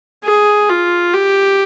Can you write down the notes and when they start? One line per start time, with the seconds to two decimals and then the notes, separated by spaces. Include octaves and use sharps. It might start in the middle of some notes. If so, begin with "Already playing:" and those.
0.24 G#4
0.69 F4
1.14 G4